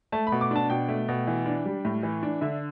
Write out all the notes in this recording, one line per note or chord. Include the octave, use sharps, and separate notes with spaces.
A3 A5
B5
B2
D6
D4 A5
B2 G5
A3
B2
E3
D4
G3
A2
E3
D4
D3 E5